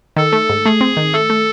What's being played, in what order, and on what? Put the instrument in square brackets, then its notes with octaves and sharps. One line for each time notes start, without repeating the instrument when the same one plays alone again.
[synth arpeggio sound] D#3 [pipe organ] A4
[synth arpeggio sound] A3
G#2
[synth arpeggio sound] A3 [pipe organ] G#4
[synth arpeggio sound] C4
D#3
[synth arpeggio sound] A3 [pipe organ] A4
[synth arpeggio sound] A3